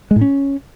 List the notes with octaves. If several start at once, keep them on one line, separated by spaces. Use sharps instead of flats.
G#3
A2
C#4